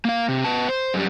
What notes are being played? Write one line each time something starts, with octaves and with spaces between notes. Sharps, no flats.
A#3 F5
C3
B3 A5
C5
F#2 G3